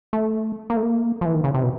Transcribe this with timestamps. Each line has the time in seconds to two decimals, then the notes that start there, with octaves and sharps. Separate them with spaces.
0.13 A3
0.70 A#3
0.77 A3
0.83 A#3
1.21 F3
1.26 E3
1.35 D#3
1.44 C#3
1.54 C3
1.63 B2